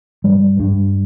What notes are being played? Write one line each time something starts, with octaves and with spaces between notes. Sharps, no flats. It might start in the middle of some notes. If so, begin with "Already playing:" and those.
G2 G3
G2